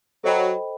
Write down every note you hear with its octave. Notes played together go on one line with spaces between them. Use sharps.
F#3 A4 C5 D#5 G5 B5